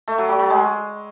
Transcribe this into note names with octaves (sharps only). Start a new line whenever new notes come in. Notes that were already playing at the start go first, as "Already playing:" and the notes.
A3
F#3
F#3
F#3
G#3